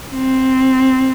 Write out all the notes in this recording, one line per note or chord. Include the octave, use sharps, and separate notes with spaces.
C4